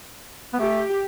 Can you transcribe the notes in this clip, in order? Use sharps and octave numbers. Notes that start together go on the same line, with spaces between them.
B3
A3 G4